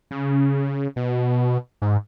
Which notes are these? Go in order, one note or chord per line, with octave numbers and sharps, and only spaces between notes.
C#3
B2
G#2